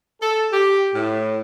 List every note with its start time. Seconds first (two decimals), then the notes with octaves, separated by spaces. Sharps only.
0.21 A4
0.52 G4
0.94 A2